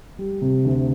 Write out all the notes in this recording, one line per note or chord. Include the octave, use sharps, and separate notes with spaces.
G3
C3
D2